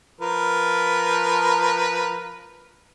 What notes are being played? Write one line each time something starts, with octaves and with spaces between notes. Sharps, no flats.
F3 A#4 B4